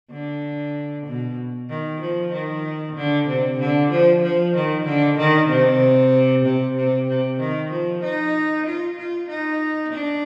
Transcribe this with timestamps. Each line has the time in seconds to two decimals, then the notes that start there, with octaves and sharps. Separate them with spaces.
0.11 D3
1.06 B2
1.69 D#3
2.01 F3
2.32 D#3
2.97 D3
3.28 C3
3.59 D3
3.91 F3
4.23 F3
4.55 D#3
4.85 D3
5.18 D#3
5.49 C3
6.45 C3
6.76 C3
7.08 C3
7.39 D#3
7.71 F3
8.03 D#4
8.66 F4
8.98 F4
9.29 D#4
9.93 D4